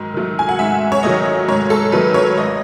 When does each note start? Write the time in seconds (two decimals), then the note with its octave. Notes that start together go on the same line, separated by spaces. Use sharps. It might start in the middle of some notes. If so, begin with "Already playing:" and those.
Already playing: G#2 D#3 F#3
0.14 D#3 F#3 A3
0.39 G#5
0.49 F#5
0.59 G#2 E5
0.92 C#5
1.03 D#3 F#3 A3 D#5
1.48 G#2 C#5
1.70 A4
1.92 D#3 F#3 A3 B4
2.14 C#5
2.37 G#1 D#5